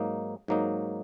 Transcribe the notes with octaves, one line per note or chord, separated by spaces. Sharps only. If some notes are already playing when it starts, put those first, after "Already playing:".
Already playing: G#2 F#3 A#3 D#4
G#2 F#3 A#3 D#4